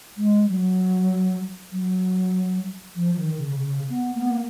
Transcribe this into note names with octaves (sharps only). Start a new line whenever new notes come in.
G#3
F#3
F#3
F3
D#3
C#3
C#3
B3
A#3
B3
A#3